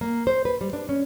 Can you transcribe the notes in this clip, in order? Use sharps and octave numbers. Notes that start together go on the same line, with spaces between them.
A#3
C5
B4
G3
D4
C#4